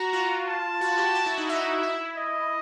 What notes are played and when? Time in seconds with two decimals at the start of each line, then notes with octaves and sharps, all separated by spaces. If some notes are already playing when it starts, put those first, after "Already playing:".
Already playing: F#4 A#5
0.13 F4
0.47 A5
0.81 F#4
0.98 G4
1.15 F#4
1.26 E4
1.38 D#4
1.49 E4 E5
1.83 E4
2.16 D#5